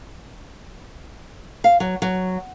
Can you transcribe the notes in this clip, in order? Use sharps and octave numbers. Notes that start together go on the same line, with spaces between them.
F5
F#3
F#3